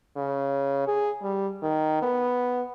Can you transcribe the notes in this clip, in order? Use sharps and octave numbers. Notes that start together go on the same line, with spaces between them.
C#3
G#4
G3
D#3
B3